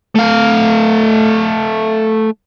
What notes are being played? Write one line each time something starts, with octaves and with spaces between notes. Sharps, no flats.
A3 F5